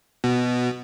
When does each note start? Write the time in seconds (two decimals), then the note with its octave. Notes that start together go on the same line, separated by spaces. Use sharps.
0.24 B2